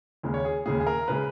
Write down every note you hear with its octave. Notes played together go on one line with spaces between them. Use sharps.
D#2 C#3 G#3
C#5
G#4
D#2 C#3 G#3 G#4
G#4
A#4
C#3 G#3 B4